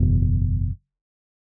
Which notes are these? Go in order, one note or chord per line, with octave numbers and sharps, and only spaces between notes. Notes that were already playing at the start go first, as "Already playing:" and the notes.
Already playing: F#1 E2 B2